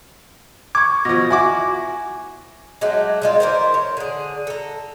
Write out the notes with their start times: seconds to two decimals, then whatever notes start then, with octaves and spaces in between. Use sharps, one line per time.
0.75 C#6 D6 G#6
1.05 B2 F3 A#6
1.30 E4 F#4 G#5 D6
2.81 F#3 G#3 A3 G4
3.22 G3 G#3 F4
3.40 E3 A#4 C5
3.74 C#5
3.97 D3 G#4
4.47 A4 A#5